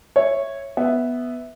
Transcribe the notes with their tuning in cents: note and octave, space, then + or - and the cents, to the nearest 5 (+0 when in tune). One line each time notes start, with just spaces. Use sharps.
C#5 -10 E5 +0
B3 +0 E5 -5